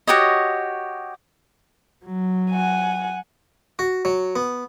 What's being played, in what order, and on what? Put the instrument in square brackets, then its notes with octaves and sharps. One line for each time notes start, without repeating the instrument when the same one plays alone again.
[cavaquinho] F#4 G4 C#5 D#5
[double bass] F#3
[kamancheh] F#5 G#5
[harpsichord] F#4
F#3
B3